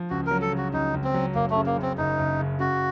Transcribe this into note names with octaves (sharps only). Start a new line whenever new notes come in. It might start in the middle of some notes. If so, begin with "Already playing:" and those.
Already playing: F3
C#2 F#4
F#3 A#4
A4
C#3
F#4
C#2 D#4
C#2
C4
F#3
F#1 A#3
A3
C#3
A#3
F#2 C4
F#1 D#4
F#1
C#3
C#3 F#4